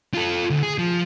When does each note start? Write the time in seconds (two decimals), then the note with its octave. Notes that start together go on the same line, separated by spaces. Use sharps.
0.14 F4 A4
0.50 D2
0.63 G#4
0.78 F3